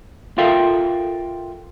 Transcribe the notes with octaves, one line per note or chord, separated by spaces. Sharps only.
F4 A4 A#4 E5 F5 G5